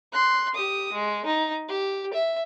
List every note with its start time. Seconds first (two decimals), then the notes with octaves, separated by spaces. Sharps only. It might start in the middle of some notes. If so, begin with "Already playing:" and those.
0.13 C6 F#6
0.54 G4 D#6
0.93 G#3
1.25 D#4
1.69 G4
2.13 E5